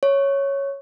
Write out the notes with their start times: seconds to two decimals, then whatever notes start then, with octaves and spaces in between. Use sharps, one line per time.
0.03 C#5